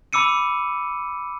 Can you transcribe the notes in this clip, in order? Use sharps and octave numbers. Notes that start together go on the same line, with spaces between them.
B5 D6 E6 C#7 D#7